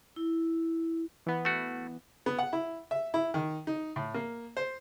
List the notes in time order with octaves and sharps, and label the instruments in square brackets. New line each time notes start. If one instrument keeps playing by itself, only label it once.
[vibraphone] E4
[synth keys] E3 B3
[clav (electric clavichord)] A3 F#4
[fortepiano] B3
F#5
E4
E5
E4
D#3
D#4
A2
A#3
C5